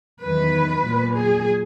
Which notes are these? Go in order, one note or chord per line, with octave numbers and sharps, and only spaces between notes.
E2 D#3 F#3 B4
A#2 F#3
G#4